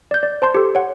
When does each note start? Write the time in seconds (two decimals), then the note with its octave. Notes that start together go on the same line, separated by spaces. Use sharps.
0.11 D5 G6
0.23 D5
0.42 C5 A5 C6 G6
0.55 G4 A4
0.75 C#5 F#5